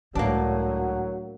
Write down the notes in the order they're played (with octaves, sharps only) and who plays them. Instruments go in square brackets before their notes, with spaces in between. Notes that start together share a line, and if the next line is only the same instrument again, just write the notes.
[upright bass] C#2 [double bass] A2 [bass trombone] F#3 [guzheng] A#3 D4